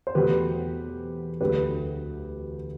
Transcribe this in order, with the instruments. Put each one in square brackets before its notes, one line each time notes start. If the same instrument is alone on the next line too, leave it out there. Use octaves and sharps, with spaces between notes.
[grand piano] C5
E2 B2 F#3 A3 G4 B4
D2 D3 F#3 A3 G4 B4